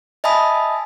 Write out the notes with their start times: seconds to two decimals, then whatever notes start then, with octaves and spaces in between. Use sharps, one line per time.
0.24 D#5 E5 G#5 A5 B5 D#6